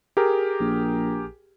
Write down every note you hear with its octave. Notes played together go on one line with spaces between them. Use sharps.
G4 G#4 A#4
A#1